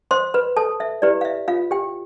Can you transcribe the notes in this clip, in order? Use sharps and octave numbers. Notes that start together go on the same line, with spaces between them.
C5 C6
B4 B5
A4 A5
E5
E4 G4 B4 D5
F5
E5
F4 F5
G4 G5